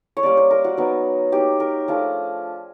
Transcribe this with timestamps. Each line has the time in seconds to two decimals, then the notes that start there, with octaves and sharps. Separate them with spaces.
0.17 C#5
0.23 G3 A#3 C#4 D5
0.37 C5
0.51 A#4
0.64 F#4
0.77 F#3 B3 D#4
1.32 F#3 A#3 D#4 G4
1.60 A#4
1.88 F3 A3 D4 F4 G#4